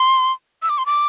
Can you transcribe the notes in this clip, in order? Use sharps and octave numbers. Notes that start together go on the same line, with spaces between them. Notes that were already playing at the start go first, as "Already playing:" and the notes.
Already playing: C6
E6
D6
C6
D6